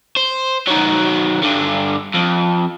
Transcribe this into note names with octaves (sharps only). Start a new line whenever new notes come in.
C5
D#3 F#3
G2 D3
F2